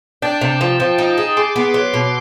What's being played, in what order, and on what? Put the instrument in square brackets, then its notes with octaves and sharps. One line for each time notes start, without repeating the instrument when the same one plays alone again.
[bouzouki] D4 [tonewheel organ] G5 A5
[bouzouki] C3
F3
F3
D#4
G#4
[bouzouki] G#4 [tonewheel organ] C6 D6
[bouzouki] B3
F#3
B2